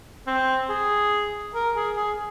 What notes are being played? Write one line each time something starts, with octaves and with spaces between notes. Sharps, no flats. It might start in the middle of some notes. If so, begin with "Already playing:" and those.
C4
G#4
A#4
G#4
G#4